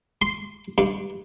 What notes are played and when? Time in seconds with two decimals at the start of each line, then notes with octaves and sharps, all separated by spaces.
0.22 C6
0.78 G2